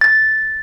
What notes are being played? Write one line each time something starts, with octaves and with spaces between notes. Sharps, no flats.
A6